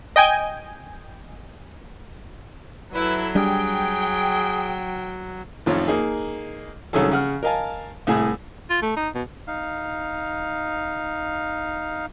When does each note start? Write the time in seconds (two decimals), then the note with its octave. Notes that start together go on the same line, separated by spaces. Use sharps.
0.16 D#5 G5 G#5 G6
2.94 F#3 E4 A4 B4
3.35 G3 D4 G#4 G5
5.66 A1 F2 D#3 F4 C#5
5.88 A#3 D#4 G#4
6.93 C2 D#3 F#3 C#4 G#4 A4
7.11 C#3 F#5 F6
7.43 A#4 D#5 F5 G#5 A5
8.07 C2 A2 G#4 G#5
8.70 F4
8.82 A3
8.96 D#4
9.15 B2
9.47 D#4 F5